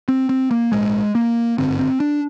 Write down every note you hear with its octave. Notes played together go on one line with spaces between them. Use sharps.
C4
C4
A#3
A#1 G#2 G#3
A#3
G#1 G2 D3 C4
C4
D4